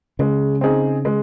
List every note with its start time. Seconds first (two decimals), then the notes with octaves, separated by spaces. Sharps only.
0.19 C#3 G#3
0.61 C4 D#4 G#4
1.05 G#3